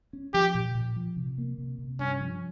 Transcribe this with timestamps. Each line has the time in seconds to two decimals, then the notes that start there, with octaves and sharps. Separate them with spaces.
0.13 C#4
0.34 F3 G4
0.55 A#2
0.75 A#2
0.96 F3
1.16 C3
1.38 A#3
1.58 C3
1.79 C3
1.99 G2 C#4
2.21 F3